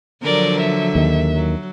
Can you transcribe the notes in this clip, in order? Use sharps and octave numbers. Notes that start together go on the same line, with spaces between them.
D3 F3 F#3 A#4 D5
E5
D#2 D#3
F#3